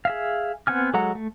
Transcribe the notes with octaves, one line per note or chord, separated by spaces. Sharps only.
G#4 E5 F5
B3 C4 F#5 G#5 F6
F#3 G#3 A4 F#5 A#5
A3